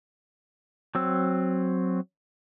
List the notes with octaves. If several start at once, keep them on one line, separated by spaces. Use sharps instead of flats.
F#3 C4 E6